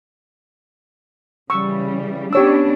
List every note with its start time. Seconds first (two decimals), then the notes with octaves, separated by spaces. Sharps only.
1.50 C#3 E3 G3 C#6 E6
2.33 B3 C#4 D4 G4 C#5 E6